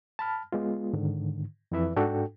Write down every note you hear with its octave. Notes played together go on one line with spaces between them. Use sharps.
A5 B5 F6
G#3 B3 F4
G#2 D3 D#3
F2 E3 E4 B4 E5
G#2 D4 F#4 A4 G5